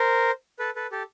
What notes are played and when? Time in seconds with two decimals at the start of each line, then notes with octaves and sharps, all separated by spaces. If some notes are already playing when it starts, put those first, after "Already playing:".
Already playing: A#4 C5
0.59 A4 B4
0.76 A4 B4
0.92 G4 A4